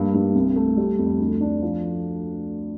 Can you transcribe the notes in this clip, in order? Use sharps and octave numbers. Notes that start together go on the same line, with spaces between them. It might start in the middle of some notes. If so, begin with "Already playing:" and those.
Already playing: G2 A#3
G2
C2
A3
G3
F2
D2
D4
F3